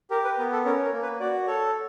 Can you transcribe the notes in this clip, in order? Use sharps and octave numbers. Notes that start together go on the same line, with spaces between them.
G4 A#4
B4
B3 A#4
A4
C#4 A#4
A#4
A#3
B4
F#4 D5
A4 C#5